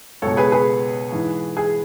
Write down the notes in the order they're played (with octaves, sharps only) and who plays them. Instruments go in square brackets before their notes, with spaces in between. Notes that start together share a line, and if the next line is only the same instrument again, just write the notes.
[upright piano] C#2 B2 A4 C#5
G#4 B4
G#4 B4
G#2 E3
G#4